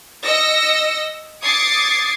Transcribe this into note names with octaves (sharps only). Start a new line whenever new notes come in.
D#5 E6 A#6 C#7
D6 D#6 G#6 A6 C7 C#7